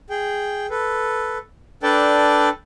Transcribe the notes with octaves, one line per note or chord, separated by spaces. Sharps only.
G#4 G5
A4 B4
D4 A4 B4 D5 G5 A5